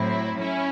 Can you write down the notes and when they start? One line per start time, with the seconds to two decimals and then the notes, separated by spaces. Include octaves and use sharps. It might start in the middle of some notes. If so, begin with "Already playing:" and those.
Already playing: A2 F#3 C4 E4
0.40 C#4 E4